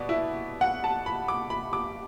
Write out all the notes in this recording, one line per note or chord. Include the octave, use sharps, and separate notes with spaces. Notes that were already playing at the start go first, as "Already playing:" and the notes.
Already playing: B2 B3 D5
E4
F#5
A5
B5
D6
B5
D6